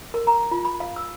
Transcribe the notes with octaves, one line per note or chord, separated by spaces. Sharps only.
A#4
A#5
F4
B5
F5
E6